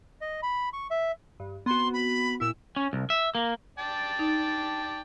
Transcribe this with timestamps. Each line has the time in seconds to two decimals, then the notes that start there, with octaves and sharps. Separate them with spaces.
0.21 D#5
0.43 B5
0.73 C#6
0.91 E5
1.40 G2
1.66 B3 C4 F#4 C6
1.93 B5
2.40 A#2 E4 E6
2.76 C#4
2.93 C2
3.10 E5
3.35 A#3
3.79 D5 G5 A5
4.19 D#4